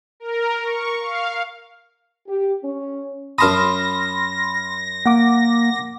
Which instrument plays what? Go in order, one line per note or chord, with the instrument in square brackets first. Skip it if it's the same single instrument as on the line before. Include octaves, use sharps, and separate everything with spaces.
[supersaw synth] A#4
C#6
F5
[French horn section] G4
C#4
[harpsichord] F#2 A5 D#6 [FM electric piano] B5 C6 F6 [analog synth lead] A#6
[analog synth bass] A#3 [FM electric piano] F#5 D6